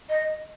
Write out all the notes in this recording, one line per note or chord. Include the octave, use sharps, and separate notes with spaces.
D#5